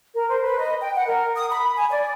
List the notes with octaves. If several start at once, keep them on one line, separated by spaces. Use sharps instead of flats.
A#4
C5
B4
D#5
G5
F#5
A#4
D#6
B5
G#5
D5